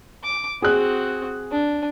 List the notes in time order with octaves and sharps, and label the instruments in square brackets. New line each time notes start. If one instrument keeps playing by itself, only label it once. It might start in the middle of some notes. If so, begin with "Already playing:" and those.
[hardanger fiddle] D6
[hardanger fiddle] C4 F#4 [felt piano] G#4 F#6
[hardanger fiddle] D4